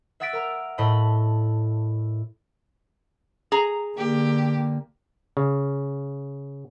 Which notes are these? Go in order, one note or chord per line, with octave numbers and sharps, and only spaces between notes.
E5 F#5 E6 A6 B6 D7
A#4 A#5
A2 D#5 A5 B5 B6
G#4 A#5
D3 A#3 G4
C#3